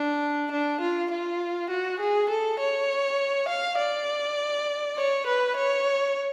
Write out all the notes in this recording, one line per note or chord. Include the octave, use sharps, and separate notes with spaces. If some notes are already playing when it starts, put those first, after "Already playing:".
Already playing: D4
D4
F4
F4
F#4
G#4
A4
C#5
F5
D5
C#5
B4
C#5